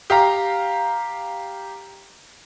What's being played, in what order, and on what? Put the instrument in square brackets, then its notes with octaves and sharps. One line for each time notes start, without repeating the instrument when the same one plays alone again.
[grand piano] G4 F5 A#5